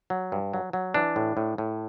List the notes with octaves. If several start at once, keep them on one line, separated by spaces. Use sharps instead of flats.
F#3
G2
F#3
F#3
E3 D4
A2
A2
A2